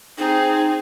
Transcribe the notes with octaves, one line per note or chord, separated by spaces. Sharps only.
C4 D#4 G#4